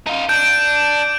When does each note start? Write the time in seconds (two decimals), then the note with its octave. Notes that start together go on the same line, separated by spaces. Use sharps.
0.07 D#4 F4
0.29 D4 G6 D7